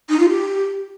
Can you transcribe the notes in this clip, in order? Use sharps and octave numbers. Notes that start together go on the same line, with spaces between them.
D#4
F4
G4